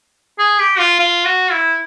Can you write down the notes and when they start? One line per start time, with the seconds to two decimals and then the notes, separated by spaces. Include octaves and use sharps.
0.39 G#4
0.59 G4
0.79 F4
0.99 F4
1.25 F#4
1.52 E4